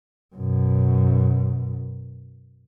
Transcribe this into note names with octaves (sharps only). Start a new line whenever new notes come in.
F#2 B2